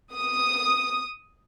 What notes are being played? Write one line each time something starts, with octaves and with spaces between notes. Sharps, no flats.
D#6